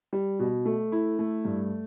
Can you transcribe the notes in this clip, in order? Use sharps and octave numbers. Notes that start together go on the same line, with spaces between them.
G3
B2
A3
E4
A3
G2